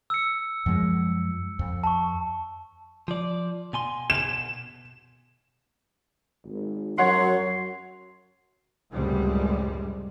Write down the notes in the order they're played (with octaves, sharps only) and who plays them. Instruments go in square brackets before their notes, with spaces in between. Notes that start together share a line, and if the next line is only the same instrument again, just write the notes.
[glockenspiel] E6 C#7
[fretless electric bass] F#2 F3 G#3
F2
[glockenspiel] A5 C#6
[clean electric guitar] F3 D5
B2 G#5 C6
[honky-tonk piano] E7
[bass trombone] G#1
[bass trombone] F#2 [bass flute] F#3 [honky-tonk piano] C#5 F#5 [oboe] C6
[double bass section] C#2 F#2 A2 C3 G3 G#3